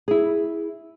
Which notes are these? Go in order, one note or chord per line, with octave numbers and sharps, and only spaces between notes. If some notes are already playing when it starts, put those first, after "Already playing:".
E4 G#4